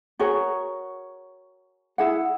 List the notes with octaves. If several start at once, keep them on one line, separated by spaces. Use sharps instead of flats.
F#4 G#4 A#4 C#5
E4 G#4 F#5